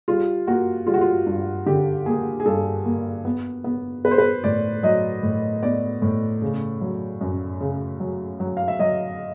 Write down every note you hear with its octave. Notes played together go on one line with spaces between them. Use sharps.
G3 F4
A#3 F#4
G3 F4
F#4
F4
G2
D3 G4
A#3 G#4
G#4
G2 A4
A#3
B3
B3
B3 B4
C5
B4
A2 D5
F#3 D#5
A2
B3 D5
A2
C#3
F#3
F#2
C#3
F#3
F#3
F5
E5
F#3 D#5